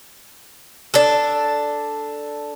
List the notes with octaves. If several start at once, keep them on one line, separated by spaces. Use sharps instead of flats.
D4 A4